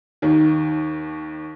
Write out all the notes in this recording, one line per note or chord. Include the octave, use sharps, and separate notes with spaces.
D#2 D#3